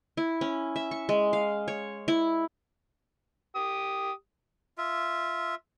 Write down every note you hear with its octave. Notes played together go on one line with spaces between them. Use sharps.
E4
C#4
E5
C#6
G#3
F5
C#5
E4
G4 D#6
F4 E5